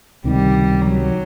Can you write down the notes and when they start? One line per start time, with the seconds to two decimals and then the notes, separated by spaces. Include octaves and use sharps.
0.24 C#2 C3 D#3 G3
0.86 F#3